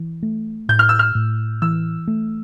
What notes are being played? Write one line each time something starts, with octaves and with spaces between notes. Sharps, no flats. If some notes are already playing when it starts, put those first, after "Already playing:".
Already playing: E3
A3
A2 G6
F6
E6
F6
A2
E3 E6
A3